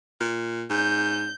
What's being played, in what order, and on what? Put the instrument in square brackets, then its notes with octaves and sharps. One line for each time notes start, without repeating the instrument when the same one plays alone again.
[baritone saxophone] A#2
[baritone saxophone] G#2 [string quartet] G6